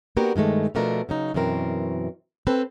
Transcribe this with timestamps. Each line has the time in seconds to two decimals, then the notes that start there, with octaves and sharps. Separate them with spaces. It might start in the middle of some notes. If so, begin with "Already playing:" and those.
0.17 A#3 B3 D4 F#4 G4 A#4
0.36 G2 D#3 G#3 A3
0.75 B2 F3 A3 D4 A#4
1.09 C#3 F#3 D#4
1.34 F#2 B2 E3 C4 A#4
2.47 C4 A4 B4